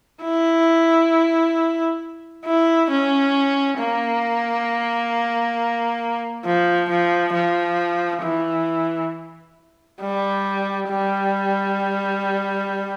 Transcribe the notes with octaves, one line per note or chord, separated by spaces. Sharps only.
E4
E4
C#4
A#3
F3
F3
F3
E3
G3
G3